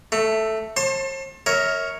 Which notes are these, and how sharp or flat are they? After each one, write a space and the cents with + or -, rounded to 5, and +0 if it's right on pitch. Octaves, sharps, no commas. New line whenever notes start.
A3 +0 A5 +45
C5 +45 A5 +15 C6 +35
A#4 +0 C#5 +0 E5 -35